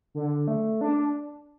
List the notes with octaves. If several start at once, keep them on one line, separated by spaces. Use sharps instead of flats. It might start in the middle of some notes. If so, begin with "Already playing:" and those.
D3
A3
D4